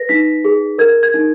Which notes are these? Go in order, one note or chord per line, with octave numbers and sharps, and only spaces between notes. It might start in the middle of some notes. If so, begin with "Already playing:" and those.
Already playing: B4 A#6
D#4 B6
G#4
A#4 G#6
G#6
D#4